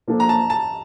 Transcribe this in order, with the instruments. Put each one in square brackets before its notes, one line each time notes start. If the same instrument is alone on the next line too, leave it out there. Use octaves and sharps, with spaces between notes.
[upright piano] F3 A#3 D4 A4
[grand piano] A#5
A5
A5